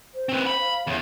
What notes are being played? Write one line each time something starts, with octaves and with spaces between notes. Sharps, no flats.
C5
C4 B4
B5
F5
E2 C#4